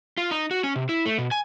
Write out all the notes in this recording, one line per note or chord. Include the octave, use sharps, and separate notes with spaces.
F4
D#4
F#4
C#4
C3
E4
A3
B2
G#5